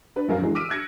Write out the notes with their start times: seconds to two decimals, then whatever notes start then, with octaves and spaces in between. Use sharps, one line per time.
0.16 D4 B4
0.28 A#1 F#2 A#4 F5
0.40 D3 E3 G#3
0.55 D6 E6 F6 B6 D7 D#7
0.69 E6 F#6 G#6 A#6 C#7